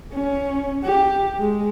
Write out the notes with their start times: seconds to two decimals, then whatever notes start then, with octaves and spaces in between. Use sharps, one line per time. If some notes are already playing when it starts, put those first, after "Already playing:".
0.12 C#4
0.84 G4
1.39 G#3